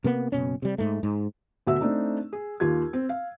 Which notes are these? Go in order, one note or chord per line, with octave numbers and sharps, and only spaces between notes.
C3 A#3 B3
F#1 B2 C#4
C3 G3
G#2 A3
G#2
D2 B2 F#4 E5 E6
A3 C4 D4 D#4
G#4
D#2 F4 G4 G#6
C4
F5